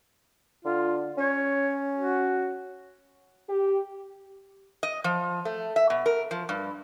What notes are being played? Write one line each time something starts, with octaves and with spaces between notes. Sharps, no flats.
D3 F4
C#4 C#5
F#4
G4
D#5
F3
A3
E5
B2
A#4
F3
G2